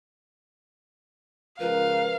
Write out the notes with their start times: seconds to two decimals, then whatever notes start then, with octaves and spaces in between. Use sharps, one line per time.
1.60 C#2 F3 A#4 B4 F5